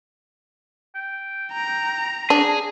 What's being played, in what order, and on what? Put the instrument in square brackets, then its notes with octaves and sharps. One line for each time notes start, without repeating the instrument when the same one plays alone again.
[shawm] G5
[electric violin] A#5
[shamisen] D4 [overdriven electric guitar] G#4